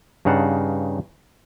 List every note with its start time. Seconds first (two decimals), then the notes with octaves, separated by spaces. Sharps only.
0.25 G2 C#3 D#4 F5 F#5 A5